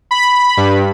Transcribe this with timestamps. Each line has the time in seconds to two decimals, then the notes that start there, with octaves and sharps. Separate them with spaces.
0.11 B5
0.57 G2